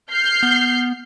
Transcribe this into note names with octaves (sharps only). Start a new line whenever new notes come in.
F6 G6 C7
B3